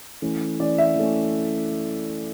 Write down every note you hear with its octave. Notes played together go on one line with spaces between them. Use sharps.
E3 A3 C#4
E3 A3 C#4 D5
E5
E3 A3 C#4